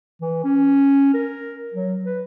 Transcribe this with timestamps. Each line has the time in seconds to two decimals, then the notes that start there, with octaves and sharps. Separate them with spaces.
0.21 E3
0.44 C#4
1.14 A#4
1.74 F#3
2.05 B4